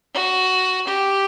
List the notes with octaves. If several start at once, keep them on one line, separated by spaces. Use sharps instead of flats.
F#4
G4